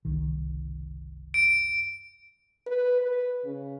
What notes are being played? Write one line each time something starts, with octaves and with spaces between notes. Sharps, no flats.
F#1 C2 D#3
D7
B4
B4
C#3